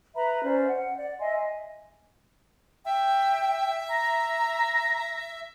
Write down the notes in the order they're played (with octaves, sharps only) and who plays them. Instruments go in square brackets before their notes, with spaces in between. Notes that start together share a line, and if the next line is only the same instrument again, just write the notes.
[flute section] B4 E5 A#5 B5
C#4 C5 D5
F#5
D5
D#5 E5 G#5 C6
G#5
[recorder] E5 [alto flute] G5
[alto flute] A#5 [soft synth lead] A#6